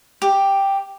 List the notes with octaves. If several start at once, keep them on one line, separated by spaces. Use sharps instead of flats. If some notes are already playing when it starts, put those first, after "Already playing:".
G4